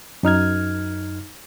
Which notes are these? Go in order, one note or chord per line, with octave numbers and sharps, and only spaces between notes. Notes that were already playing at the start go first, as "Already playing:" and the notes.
F#2 D#4 F6 G#6